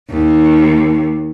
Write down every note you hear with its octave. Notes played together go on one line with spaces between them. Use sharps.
D#2